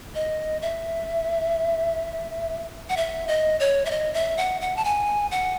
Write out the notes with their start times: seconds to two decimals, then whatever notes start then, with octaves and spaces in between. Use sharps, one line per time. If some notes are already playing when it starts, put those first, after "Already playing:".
0.15 D#5
0.62 E5
2.89 F#5
2.97 E5
3.28 D#5
3.60 C#5
3.85 E5
3.91 D#5
4.14 E5
4.38 F#5
4.61 F#5
4.76 A5
4.84 G#5
5.31 F#5